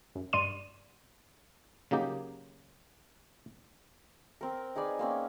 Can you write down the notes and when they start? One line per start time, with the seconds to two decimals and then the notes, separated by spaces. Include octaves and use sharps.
0.15 F#2
0.33 G2 D5 C6 D#7
1.91 C#3 F#3 A#3 D#4 G4
4.41 C4 A#4
4.76 D#4 G#4 B4 D5
4.99 A#3 C4 C#4